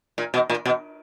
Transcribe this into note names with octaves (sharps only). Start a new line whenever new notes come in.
A#2
B2
A#2
B2